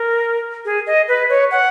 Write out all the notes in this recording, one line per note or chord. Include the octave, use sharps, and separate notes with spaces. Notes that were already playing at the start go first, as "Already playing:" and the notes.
Already playing: A#4
G#4
D#5
B4
C#5
F#5